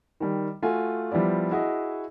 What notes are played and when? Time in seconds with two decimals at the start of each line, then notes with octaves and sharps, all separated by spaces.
0.20 D#3 G3
0.62 A3 F4 F#4 G#5
1.12 F3 G3 B3 E4 D5
1.51 E4 F#4 G#4 D#5